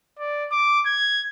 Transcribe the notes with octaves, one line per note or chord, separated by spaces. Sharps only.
D5
D6
G#6